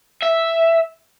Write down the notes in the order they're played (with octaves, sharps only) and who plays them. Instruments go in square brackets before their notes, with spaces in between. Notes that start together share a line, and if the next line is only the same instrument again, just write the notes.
[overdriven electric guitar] E5